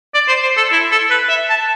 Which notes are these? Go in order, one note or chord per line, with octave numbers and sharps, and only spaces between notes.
D5
C5
C5
A4
E4
A4
B4
E5
A5